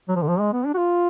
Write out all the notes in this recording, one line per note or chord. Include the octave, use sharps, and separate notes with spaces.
F#3
F3
D3
F3
G#3
B3
D4
F#4
F4